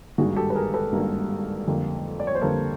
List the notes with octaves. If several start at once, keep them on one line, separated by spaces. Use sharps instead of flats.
G#1 G2 D#3 G3 A#3 F#4 G#4
G4 A4
B4
G#4 A#4
A4 B4
G#1 G2 D#3 G3 A#3
F2 D3 G3 A#3
D5
C#5
C5
F2 D3 G3 A#3 A4 B4